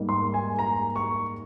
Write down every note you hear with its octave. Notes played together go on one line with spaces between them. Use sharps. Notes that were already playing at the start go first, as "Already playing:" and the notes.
Already playing: G#2 G3 A#3 D#4
C6
G#5
A#5
C#6